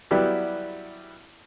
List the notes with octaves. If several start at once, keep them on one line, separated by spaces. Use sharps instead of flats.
F#3 G3 B3 E4 G4